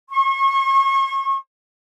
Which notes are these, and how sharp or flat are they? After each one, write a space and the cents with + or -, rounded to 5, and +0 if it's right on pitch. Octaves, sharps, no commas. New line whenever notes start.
C#6 -35